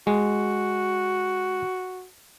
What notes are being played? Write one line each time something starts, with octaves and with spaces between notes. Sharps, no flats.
G#3 F#4